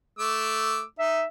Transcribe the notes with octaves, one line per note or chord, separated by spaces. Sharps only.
A3 D6 E6
D#4 E5